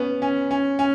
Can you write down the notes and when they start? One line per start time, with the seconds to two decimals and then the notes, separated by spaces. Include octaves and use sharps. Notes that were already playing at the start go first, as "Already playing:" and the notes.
Already playing: B3 C#4
0.22 C#4
0.51 C#4
0.79 C#4